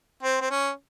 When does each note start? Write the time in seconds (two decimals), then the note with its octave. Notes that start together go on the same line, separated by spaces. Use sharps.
0.23 C4
0.41 C4
0.51 C#4